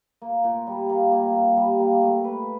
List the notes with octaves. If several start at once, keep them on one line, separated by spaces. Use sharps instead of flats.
A#3
A#2
G3
A#3
A#3
A#3
G3
A#3
A3
B4